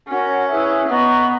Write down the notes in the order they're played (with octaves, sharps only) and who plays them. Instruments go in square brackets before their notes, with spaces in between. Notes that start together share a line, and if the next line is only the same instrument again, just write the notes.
[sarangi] C#4 [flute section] F#4 A#4 C#5 F#5
[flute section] E4 G#4 B4 E5
[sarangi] B3 [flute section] B4 D#5 A#5 C#6